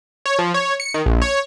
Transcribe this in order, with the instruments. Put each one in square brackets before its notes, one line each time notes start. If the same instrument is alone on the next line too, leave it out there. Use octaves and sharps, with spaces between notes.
[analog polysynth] C#5
F3
C#5
C#7
D#3
A#1
C#5